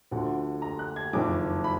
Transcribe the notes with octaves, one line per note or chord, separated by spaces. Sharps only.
D2 D3 F3 F#5
A#5
F#6
G#6
F#1 F2 D#3 D6
B5